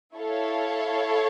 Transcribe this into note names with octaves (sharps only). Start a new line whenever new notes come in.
E4 A4 C#5 F5